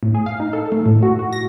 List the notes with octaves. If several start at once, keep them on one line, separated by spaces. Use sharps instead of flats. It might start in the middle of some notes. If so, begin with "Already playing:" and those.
A2
G#4
F5
D#4
A4
A3
A2
F#4
F#4
A#6